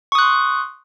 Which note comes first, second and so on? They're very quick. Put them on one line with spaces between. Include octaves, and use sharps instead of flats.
C#6 D#6 F#6 C6